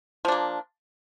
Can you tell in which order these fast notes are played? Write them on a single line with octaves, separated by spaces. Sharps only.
F3 D4 A#3